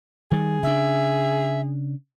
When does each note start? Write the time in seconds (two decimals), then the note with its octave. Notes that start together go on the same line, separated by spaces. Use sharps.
0.31 D#3 G3 G#4
0.63 C#3 D4 E5